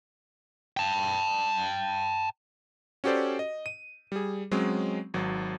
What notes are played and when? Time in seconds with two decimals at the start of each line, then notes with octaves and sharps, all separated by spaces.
0.77 G5 A5
3.04 C#4 F#4 G4 A4 C5 D5
3.39 D#5
3.66 D#7
4.12 G3 G#4
4.51 F#3 G#3 C4 C#4
5.14 G#1 F#3